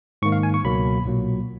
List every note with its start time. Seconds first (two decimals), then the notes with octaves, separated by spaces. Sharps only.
0.22 G#2 D#3 A#3 C#6
0.32 F5
0.43 G#5
0.54 C#6
0.64 C#2 B2 F#3 A#3 B5
1.05 B1 A#2 F#3 A#3